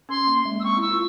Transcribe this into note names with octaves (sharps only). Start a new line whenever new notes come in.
C#4 C6
A#3
G#3
E6
C4 C#6
E4 E6
F4